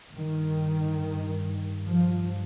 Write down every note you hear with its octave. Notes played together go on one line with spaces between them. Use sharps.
G2 D#3
F3